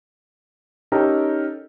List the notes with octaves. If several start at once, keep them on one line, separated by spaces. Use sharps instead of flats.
C#4 D#4 G4 A4 A#4